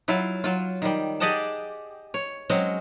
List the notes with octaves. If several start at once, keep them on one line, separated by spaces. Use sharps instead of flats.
F#3 E4 F4 F5
F#3 F4
D#3 G3
G4 G#4 D5 D#5 F#5 A5
C#5
F#3 G#3 C4 C#4